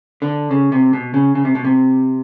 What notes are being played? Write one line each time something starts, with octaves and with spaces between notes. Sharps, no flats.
D3
C#3
C3
B2
C#3
C#3
C3
B2
C3